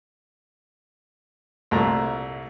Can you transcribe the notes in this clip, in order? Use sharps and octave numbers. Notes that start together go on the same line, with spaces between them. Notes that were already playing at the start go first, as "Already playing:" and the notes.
C2 A#2 A3 A#5